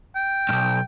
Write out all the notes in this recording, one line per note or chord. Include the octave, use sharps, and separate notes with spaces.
G5
B1 G2